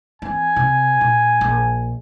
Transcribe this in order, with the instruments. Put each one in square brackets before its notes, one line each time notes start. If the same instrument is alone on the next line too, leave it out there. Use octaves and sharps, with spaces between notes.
[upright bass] E3 C4 [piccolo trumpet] G#5
[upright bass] C3
A#2
A#1